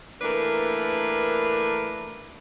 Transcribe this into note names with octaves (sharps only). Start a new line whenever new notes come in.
E3 A3 A#3 D4 A#4 B4